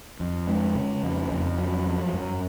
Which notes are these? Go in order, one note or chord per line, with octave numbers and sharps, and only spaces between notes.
F2
G#3
C#3
F2
F2
F#3
F3
F#2